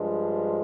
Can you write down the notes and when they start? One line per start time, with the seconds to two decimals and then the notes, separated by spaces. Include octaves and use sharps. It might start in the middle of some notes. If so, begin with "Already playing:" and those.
Already playing: G2 F3 G#3